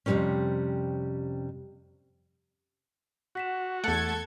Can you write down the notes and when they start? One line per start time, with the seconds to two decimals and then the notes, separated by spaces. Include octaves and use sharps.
0.06 F2 C3 F3 G3 A#3 C#4
3.35 F#4 F#5 B6 E7
3.84 E2 A3 A4 F#5 F#6 G#6 A6 C#7